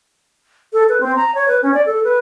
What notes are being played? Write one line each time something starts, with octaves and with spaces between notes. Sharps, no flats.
A4
B4
C4
A#5
C#5
B4
C#4
D5
A4
B4